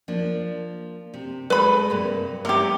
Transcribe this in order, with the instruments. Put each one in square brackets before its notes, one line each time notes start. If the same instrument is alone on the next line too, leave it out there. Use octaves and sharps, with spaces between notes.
[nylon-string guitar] F3 A#3 D4
C3
[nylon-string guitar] G#3 G#4 A4 [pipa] B4 B5
[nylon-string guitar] G2 C3 A#3
[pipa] C3 G4 [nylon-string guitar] G#3 B3 A#4